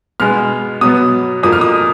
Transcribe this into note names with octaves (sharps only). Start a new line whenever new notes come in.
B2 G#3 B3 F6
B2 F#3 B3 D#6
F2 F3 A#3 D#6
F6
D#6